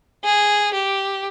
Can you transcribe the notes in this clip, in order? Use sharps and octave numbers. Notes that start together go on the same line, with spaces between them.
G#4
G4